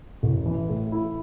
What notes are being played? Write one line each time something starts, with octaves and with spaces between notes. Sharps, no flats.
A1
E3
A2
E4